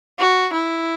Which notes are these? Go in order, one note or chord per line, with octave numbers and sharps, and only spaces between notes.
F#4
E4